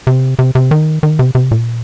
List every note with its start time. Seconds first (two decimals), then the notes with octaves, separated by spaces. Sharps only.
0.07 C3
0.39 C3
0.55 C3
0.71 D#3
1.03 D#3
1.19 C3
1.35 C3
1.51 A#2